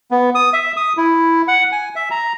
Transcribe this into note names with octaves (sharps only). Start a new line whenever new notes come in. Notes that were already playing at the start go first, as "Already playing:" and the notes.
B3
D#6
E5
D#6
E4
F#5
G#5
E5
A#5